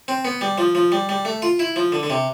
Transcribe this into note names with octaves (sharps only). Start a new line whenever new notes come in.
C4
B3
G3
F3
F3
G3
G3
A3
F4
E4
F3
D3
D3
C3